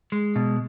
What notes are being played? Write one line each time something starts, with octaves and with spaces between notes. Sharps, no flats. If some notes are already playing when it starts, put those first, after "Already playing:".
G#3
B2